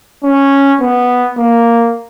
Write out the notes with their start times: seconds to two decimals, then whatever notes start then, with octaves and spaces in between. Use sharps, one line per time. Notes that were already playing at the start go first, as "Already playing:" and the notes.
0.24 C#4
0.81 B3
1.38 A#3